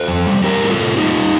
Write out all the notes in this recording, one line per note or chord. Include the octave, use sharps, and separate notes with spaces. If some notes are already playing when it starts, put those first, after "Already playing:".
Already playing: A4 C5
F2
G3
G3 G4 A#4
A2
F4 A4
A2
G3 D#4 G4
G3